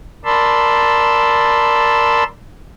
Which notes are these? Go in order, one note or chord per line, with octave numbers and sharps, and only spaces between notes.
A#4 D5 A5 B5 C6 E6